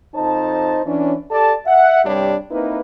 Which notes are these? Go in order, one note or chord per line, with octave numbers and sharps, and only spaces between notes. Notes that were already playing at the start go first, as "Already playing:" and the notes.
F2 D#4 C5 A5
E3 C#4 D4
G4 A4 D5 A5
E5 F#5
C2 G2 G3 D4 G4 C#5
A#3 C4 D#4 E4 B4